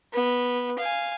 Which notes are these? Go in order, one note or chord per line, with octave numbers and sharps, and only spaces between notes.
B3
F5 G#5